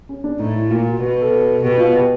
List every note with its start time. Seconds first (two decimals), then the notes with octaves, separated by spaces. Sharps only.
0.09 C#4
0.24 D4
0.39 A2 D#4
0.55 E4
0.70 A#2 F4
0.87 F#4
1.01 B2 F#4
1.21 A4
1.42 A4
1.62 B2 G4
1.78 F4
1.94 G4